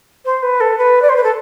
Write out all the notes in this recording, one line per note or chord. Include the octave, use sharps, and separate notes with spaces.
C5
B4
A4
B4
D5
C5
B4
A4